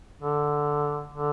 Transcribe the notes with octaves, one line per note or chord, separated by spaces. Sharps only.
D3
D3